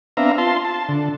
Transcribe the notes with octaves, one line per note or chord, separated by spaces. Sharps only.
B3 C4 D4 E5 F5 A#5
F4 A5 C6
A5
D3